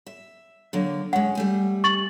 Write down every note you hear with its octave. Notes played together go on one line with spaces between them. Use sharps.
E5
D3 F#3 A#3
G#3 C#4 F#5
G3 A3 G#5
C#6 A6 F#7